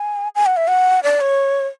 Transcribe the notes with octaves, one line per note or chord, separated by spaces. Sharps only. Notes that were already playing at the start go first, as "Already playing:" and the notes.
Already playing: G#5
G#5
F#5
E5
F#5
D5
C#5